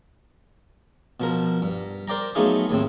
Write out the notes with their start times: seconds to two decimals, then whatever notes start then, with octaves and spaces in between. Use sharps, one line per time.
1.20 B2 F3 A#4
1.62 G2
2.08 A#4 C5 D5 G5 A#5
2.35 F#3 A3 B3 D#4 F4 G#4
2.70 D#2 A2 C4